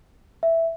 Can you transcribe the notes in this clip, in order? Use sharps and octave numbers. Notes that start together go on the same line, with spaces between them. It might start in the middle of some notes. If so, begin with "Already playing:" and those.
E5